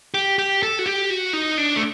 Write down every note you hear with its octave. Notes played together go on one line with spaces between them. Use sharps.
G4
G4
A4
F#4
G4
F#4
D#4
D4
A3